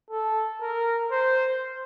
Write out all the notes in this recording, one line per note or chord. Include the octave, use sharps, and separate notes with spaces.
A4
A#4
C5